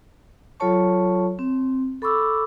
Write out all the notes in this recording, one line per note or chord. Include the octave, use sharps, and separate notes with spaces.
F#3 F4 A4 C#5 A5 C#6
C4
A4 B5 C#6 D6 E6